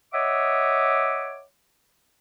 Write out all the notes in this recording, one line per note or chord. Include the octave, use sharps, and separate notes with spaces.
C#5 D#5 E5 F#5 D6